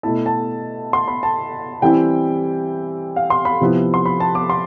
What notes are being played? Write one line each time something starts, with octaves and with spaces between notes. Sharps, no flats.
B2 A3 E4 A5
A5
C6
B5
A5
E3 G3 C4 E4 G5
F5
C6
B5
C3 F3 B3 E4
C6
B5
A5
D6
C6